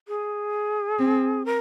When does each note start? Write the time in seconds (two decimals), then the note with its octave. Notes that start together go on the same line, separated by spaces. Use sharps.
0.08 G#4
0.99 C4
1.45 A#4